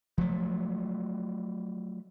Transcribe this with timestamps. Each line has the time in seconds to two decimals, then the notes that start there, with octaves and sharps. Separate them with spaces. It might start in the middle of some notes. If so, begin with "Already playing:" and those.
0.18 F3 F#3 A3